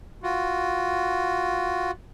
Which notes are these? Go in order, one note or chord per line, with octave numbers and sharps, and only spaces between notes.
F4 F#4